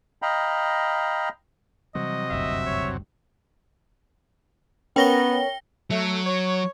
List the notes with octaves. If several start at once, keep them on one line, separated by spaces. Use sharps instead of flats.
D#5 F5 G5 A#5 B5
C3 E3 F#3 G3 D#5
F#1 D2 G2 E5
C#5
B3 C#4 A#4 C#5 G5 A#6 G7
F#3 A3
C#5